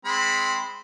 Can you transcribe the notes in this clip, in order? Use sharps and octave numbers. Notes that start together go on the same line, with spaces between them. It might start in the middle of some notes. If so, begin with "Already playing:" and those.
G#3 C4 B5